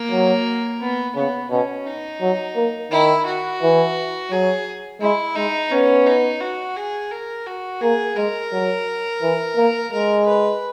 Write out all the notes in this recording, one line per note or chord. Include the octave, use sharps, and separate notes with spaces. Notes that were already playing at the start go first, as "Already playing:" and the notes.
Already playing: A#3
F#3
B3
C#3 B3
B2 C#4
D#4
F#3
A#3
D#3 E4
F#4
E3
F#3 G#4
G#3 E4
G#3 D#4
B3 C#4
D#4
F#4
G#4
A#4
F#4
A#3 G#4
G#3 A#4
F#3
E3
A#3
G#3 A#4
B4